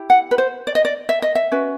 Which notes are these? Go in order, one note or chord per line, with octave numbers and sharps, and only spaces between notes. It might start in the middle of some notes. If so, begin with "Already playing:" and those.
Already playing: E4 G4
F#5
B4
C5
D5
D#5
D5
E5
D#5
E5
C#4 F#4 B4